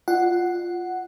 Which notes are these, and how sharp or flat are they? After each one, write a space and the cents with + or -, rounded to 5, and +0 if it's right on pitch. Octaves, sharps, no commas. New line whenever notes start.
F4 +0 D5 +45 F#5 +0